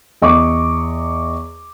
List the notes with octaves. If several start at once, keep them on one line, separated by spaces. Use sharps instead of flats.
E2 D#5 C#6 D6